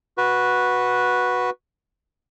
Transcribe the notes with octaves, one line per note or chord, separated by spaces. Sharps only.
F#4 B4